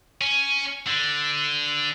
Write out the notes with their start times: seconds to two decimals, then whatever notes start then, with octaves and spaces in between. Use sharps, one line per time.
0.21 C#4
0.87 D3